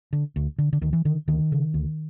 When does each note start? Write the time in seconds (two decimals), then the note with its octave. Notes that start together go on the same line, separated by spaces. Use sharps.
0.13 D3
0.36 D2
0.58 D3
0.73 D3
0.81 D2 D#3
0.93 E3
1.05 D3 D#3
1.28 D2 D#3
1.52 C#3
1.74 D2